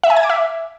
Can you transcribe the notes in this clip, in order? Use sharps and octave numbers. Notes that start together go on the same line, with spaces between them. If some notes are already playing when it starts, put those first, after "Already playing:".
E5
G#5
G#6
D6
E5